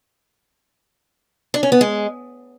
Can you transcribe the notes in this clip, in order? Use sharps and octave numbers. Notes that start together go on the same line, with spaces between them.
D4
C#4
B3
G#3